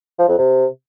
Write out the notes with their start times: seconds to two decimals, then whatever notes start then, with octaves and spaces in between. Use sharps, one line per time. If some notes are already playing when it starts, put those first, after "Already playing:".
0.19 F3
0.28 F2
0.38 C3